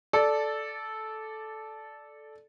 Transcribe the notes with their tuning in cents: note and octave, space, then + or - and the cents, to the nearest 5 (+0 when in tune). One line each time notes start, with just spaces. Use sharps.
A4 -10 D5 +0